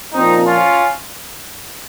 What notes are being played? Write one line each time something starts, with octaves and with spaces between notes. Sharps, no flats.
A#2 F3 C4 D#4
C#4 F4